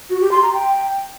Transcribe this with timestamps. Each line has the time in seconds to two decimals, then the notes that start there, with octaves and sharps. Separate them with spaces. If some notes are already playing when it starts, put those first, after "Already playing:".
0.10 F#4
0.21 G4
0.32 C6
0.42 A#5
0.53 G5